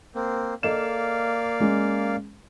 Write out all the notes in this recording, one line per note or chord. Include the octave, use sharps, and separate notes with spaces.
A#3 C4
A#3 A4 D5 D#5 F5 E7
G#3 C#4